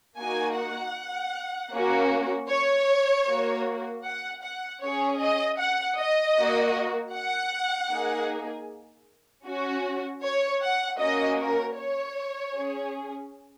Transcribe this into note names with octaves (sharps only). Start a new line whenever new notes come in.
A#3 D#4 F#4 G#5
F#5
A#3 C#4 F#4
C#5
A#3 F#4
F#5
F#5
C#4 G#4 C#5
D#5
F#5
D#5
A#3 F#4
F#5
A#3 D#4 G#4
C#4 F#4
C#5
F#5
A#3 C#4 F#4 D#5
A#4
C#5
C#4 G#4